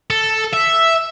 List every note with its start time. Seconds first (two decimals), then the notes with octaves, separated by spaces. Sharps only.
0.10 A4
0.53 E5